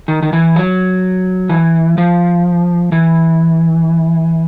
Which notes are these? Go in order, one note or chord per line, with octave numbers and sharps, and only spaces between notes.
D#3
D#3
E3
F#3
E3
F3
E3